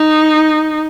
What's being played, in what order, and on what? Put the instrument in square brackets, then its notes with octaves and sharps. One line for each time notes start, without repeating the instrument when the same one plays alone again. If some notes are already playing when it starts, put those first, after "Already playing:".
Already playing: [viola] D#4